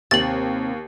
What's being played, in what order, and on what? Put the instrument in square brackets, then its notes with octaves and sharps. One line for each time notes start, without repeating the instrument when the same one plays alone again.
[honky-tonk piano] D#2 [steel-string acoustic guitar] C3 C4 [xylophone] A6 F#7